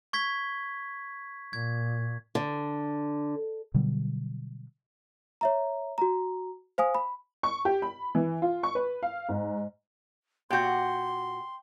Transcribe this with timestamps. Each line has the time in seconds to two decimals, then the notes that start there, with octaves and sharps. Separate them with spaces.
0.13 C#6 G#6 B6
1.53 A#2 G#6
2.35 D3
3.74 B2 D3 F#3 G3
5.41 C#5 E5 A#5
5.98 F#4 A#5
6.78 C5 F5 G#5 D#6
6.95 B5
7.43 C#6
7.65 G4
7.82 B5
8.15 E3
8.42 F4
8.63 C#6
8.75 B4
9.03 F5
9.29 G#2
10.50 A#2 F#4 G5 C6 G6